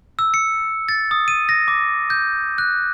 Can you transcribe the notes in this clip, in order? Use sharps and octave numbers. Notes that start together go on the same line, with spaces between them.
E6
C#7
A6
D#6
D#7
A#6
D6
G6
F#6